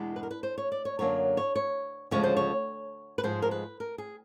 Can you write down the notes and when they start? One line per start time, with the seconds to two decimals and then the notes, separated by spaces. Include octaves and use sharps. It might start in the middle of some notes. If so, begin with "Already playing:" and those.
Already playing: E2 B2 G#3 B3 D4
0.16 B4
0.23 A#4
0.31 B4
0.43 C5
0.58 C#5
0.72 D5
0.85 C#5
0.99 F#2 D3 F#3 A#3 D4 C#5
1.37 C#5
1.56 C#5
2.11 D2 C#3 F3 G#3 C#5
2.23 C5
2.37 C#5
3.18 B4
3.23 G#2 F3 G#3 C5
3.42 A#4
3.51 B4
3.80 A#4
3.98 G#4